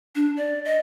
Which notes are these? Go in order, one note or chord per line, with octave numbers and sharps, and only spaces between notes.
D4
D5
D#5